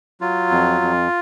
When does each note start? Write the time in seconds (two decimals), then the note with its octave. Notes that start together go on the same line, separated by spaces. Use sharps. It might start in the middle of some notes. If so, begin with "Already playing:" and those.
0.21 F#3 F4
0.51 F2
0.81 F2